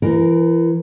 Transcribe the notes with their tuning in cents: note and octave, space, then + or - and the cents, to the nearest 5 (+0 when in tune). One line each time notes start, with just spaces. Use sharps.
E3 +30 A#4 +0